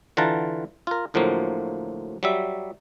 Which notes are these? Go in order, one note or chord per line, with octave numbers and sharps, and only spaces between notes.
D3 E3 F4 F#5 A5 A#5
F4 A#4
D2 A2 F3 F#3 A#3
F#3 G3 E5